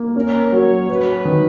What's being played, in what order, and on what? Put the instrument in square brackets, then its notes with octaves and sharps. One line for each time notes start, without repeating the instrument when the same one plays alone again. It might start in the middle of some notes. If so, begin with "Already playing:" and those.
Already playing: [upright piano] A#3
[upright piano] C#4 [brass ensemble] A#4
[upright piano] F#3 [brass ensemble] C#5
[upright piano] F#3 [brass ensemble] B4
[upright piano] D#3